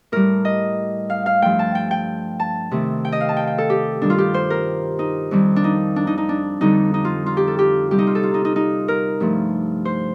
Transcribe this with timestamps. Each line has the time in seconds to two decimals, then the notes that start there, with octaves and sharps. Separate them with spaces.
0.12 A2 G3 A#4
0.45 D#5
1.10 F5
1.26 F5
1.42 G2 F3 A3 G5
1.59 A5
1.75 G5
1.91 G5
2.40 A5
2.71 C3 D#3 A3
3.05 G5
3.12 D#5
3.21 F5
3.29 A5
3.37 G5
3.47 G5
3.58 A4
3.70 G4
4.02 G2 D#3 G3 D4
4.10 F4
4.18 G4
4.34 C5
4.50 A#4
4.99 D#4
5.31 F2 D#3 G3
5.56 D4
5.64 D#4
5.96 D4
6.07 D#4
6.18 D#4
6.29 D4
6.61 F2 D3 G3 D#4
6.94 D#4
7.05 F4
7.26 F4
7.37 G4
7.47 A4
7.59 G4
7.91 C3 G3 G4
7.98 D#4
8.07 F4
8.15 A4
8.23 F4
8.34 D#4
8.45 D#4
8.56 D#4
8.88 A#4
9.20 G2 F3 A3
9.85 C5